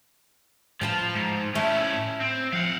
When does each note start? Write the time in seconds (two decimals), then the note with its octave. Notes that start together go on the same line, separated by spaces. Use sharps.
0.81 A2 F3 F4 G5 A5 B5
1.15 G#2
1.55 A3 C#4 E4
2.20 C4
2.53 F3 F5 F#5